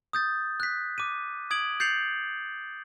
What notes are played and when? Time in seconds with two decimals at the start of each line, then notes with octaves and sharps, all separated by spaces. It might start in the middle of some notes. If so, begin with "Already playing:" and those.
0.13 D#6 G6 A6
0.60 F#6 B6
0.98 D6 D#7
1.51 D#6 G#6 D7 F#7
1.80 G6 A6 C7 C#7 F7 F#7